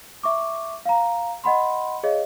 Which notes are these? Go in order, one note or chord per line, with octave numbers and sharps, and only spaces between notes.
E5 C#6 D6
F5 A#5
D#5 F#5 B5 C6
G#4 C#5 D#5 F5